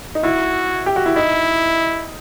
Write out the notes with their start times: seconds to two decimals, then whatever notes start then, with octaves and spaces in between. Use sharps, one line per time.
0.15 D#4
0.23 E4 F#4
0.86 G4
0.96 F#4
1.06 E4
1.16 D#4 E4